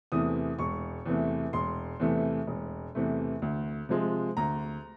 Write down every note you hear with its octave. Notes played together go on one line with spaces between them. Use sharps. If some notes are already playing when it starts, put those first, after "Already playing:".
E2 C3 E3 A3 D#6
E1 C#6
E2 C3 E3 A3
E1 C6
E2 C3 E3 A3
E1
E2 C3 E3 A3
D2
C3 F3 G#3
D2 A#5